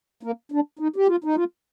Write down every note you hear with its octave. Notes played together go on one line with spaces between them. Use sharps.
A#3
D4
D#4
G4
F4
D#4
F4